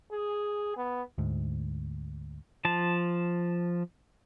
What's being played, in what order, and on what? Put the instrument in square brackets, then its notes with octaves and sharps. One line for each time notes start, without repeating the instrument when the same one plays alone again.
[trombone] G#4
B3
[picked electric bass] D2 G#2
[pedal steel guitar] F3 A5